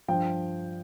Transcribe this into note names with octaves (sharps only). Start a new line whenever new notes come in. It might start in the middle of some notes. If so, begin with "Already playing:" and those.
G2 F3 G5